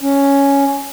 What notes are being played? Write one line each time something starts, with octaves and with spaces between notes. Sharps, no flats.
C#4